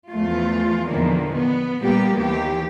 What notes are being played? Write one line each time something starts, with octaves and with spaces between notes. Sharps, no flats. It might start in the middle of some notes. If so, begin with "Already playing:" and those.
E2 F3 A3 F4
E2 A#2 D3 D#3 F3 A#3
B3
A#2 G3 A#3 B3 G4
D#2 E3 G4